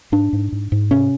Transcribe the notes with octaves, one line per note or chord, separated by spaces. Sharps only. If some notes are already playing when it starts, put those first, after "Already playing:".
G#2 D4
G#2
G#2
G#2
C3 C#4